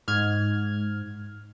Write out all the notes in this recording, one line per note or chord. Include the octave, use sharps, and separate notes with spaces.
G#2 F6 G#6